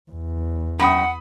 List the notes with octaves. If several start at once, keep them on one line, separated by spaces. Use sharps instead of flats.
E2
F#2 E5 F#5 G5 B5 D#6